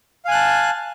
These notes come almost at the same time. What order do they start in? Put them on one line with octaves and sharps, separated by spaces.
F5 G#5 F#6 A5